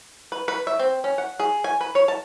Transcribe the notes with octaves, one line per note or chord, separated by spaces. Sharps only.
B4
B4
E5
C4
C#4
F#5
G#4
G#5
B4
C#5
A5